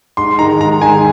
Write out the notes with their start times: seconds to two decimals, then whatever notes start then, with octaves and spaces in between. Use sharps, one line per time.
0.17 G#2 C6
0.39 D#3 G#3 A#5
0.60 G#2 A#5
0.81 D#3 G#3 G#5